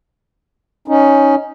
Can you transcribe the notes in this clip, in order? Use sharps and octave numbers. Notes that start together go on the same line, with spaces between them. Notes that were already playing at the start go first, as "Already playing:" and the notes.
C#4 D#4